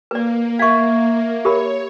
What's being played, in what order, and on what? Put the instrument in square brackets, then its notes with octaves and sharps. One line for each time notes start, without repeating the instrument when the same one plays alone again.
[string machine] A#3 [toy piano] B4 D5
[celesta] E5 G#6 [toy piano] F5 C#6
[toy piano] G4 A#4 B5 [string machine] C#5